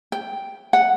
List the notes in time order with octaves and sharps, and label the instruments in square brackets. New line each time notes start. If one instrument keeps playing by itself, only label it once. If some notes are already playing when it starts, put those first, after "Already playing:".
[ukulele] G5
F#5